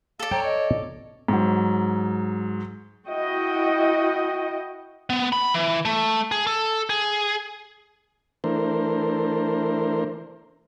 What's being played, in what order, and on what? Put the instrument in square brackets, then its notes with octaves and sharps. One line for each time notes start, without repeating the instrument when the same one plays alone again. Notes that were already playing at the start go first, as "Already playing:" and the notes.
[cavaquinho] A4 D5 [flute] F5
[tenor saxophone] C#5 [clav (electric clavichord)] G5 [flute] A#5
[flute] D#5
[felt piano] G#2 F#3
[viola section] E4 F#4 D#5 G5
[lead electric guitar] B3
B5
E3
A3
G#4
A4
G#4
[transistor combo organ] E3 A3 D4 A#4 C5